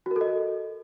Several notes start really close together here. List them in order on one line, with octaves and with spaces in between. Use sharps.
F#4 A#4 A4 D#5